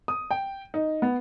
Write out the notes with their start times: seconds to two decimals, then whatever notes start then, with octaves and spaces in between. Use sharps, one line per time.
0.08 D#6
0.31 G5
0.74 D#4
1.02 B3